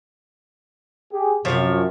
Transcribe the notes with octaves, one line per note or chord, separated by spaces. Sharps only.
G4 G#4
F#2 C3 F3 C#5